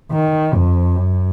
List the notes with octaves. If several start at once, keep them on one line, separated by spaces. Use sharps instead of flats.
D#3
F2
F#2